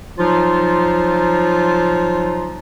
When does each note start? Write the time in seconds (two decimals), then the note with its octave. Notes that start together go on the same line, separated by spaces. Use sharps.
0.19 F3 F#3 D#4 F4